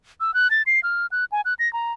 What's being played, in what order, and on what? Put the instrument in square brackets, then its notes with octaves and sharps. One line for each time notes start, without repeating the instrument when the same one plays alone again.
[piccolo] E6
F#6
A6
C7
F6
F#6
G#5
F#6
A#6
A#5